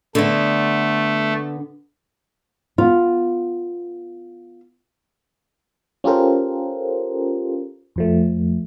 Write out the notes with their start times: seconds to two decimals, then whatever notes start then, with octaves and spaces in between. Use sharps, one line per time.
0.15 D3 A3 B3
2.78 B3 F4
6.04 C#4 F4 G4 A4 A#4 C5
7.96 F2 F3 A3